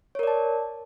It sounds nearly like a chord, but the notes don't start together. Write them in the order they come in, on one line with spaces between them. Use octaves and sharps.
C#5 A#4 D5 A5